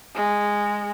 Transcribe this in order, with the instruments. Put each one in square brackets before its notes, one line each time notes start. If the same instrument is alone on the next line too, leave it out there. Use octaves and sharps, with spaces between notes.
[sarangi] G#3